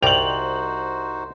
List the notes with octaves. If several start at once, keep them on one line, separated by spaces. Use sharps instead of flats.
C2 D#4 F#4 C5 D5 G5 F7 F#7